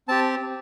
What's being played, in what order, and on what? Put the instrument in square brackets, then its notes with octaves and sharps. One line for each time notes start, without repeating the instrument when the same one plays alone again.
[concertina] C4 G4 A5